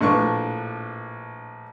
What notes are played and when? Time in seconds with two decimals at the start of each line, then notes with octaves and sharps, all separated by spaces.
0.01 A#1 A2 D4 B4 C#6